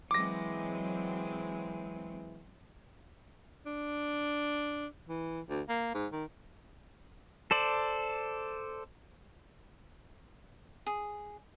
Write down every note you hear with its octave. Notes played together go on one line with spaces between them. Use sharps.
E3 F#3 G#3 C4 D6 A#6
D4
E3
D2
A#3
G#2
D#3
A4 C5 D5
G#4